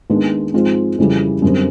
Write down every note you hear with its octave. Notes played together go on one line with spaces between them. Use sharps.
D#2 D#3 G#3 B3 D4
G#2 F3 G#3 C4 F4
F2 C#3 E3 G3
F#2 D3 G3 C4